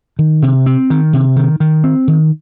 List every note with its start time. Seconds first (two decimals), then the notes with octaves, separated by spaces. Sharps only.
0.19 D#3
0.42 C3
0.66 C4
0.90 D#3
1.13 C3
1.36 D#3
1.60 D#3
1.84 C4
2.08 D#3